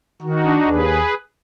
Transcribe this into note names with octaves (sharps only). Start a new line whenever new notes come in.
D#3 D#4 F#4
D4
D#2 G#4 B4